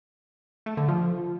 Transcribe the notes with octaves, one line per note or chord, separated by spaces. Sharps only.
A3
D3
F3